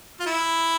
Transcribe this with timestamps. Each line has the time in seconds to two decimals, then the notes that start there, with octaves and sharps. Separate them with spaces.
0.20 F4
0.26 E4